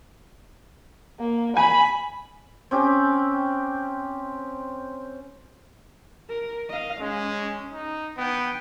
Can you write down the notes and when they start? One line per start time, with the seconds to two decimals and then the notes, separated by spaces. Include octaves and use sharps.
1.19 A#3
1.57 G#5 B5
2.71 C4 C#4 G4
6.29 A#4
6.69 D#5 F5
7.00 G#3 C#4
7.72 D#4
8.18 B3 G5